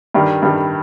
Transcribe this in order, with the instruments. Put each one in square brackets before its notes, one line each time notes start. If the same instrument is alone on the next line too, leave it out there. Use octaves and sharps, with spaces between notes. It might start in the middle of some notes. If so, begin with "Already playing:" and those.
[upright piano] G2 D#3 G3
G2 D#3 G3